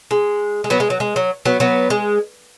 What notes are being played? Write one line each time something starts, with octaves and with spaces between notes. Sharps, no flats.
G#3
G#3
F#3 B3
G#3
F#3
G#3
F#3
F#3 B3
F#3 B3
G#3